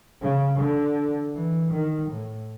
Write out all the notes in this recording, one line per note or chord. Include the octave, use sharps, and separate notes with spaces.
C#3
D3
E3
D#3
A2